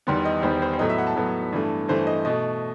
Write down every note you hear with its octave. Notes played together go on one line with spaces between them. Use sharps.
E2 D#3 G3 B3 C6
D#5
E2 D#3 G3 B3 C5
C5
C5
A2 F#3 B3 D#5
E5
F#5
A5
A2 F#3 B3
G2 E3 A3
G2 E3 A3 C5
D#5
B2 A3 D#5